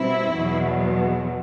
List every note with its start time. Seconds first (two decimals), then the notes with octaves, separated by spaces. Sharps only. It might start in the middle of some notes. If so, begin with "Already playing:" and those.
Already playing: B2 G3 C4 E4
0.34 E2 B2 F#3